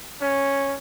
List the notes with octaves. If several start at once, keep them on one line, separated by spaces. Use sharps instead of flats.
C#4